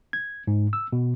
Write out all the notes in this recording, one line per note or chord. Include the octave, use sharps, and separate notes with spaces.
G#6
G#2
E6
B2